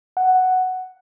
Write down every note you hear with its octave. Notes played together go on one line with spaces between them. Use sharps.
F#5